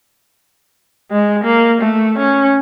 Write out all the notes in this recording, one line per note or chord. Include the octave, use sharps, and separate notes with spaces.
G#3
A#3
A3
C#4